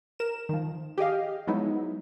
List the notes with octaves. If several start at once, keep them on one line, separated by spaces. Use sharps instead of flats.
A#4 E7
D#3 F3
G4 G#4 D#5 F5
F3 F#3 G#3 B3 D#4 E4